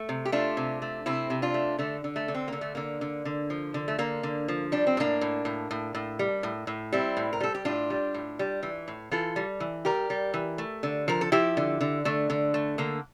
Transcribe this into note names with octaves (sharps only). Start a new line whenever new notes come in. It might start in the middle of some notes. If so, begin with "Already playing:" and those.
Already playing: A3
C3
G4
A3 D4 F4
C3
A3
C3 C4 E4
C3
D4 F4
A3
D3 A3
D3
A3
D3
C4
D3 A#3
A3
D3 A#3
D3
D3
F3
D3
A3
D3 A#3
D3
F3
G3 D4
C4
A2 A#3 D4
A2
A2
A2
A2
G3
A2
A2
G3 C4 E4
A2
A#4
G3 A4
G4
A2 D4 F4
G3
A2
G3
E3
A2
E3 F4 A4
G3
E3
G3 G4 A#4
G3
E3
A3
D3
F3 A#4
A4
F3 E4 G4
D3
D3
D3 A3
D3
A3
D3 A#3